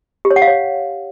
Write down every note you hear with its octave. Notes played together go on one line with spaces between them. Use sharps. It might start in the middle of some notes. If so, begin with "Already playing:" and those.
G4
C#5
F#5
F5
C#5